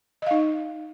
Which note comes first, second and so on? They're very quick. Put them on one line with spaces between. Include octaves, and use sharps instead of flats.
D#5 F5 D#4